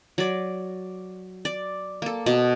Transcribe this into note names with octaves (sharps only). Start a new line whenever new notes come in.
F#3 D5
D5
A#3 A4
B2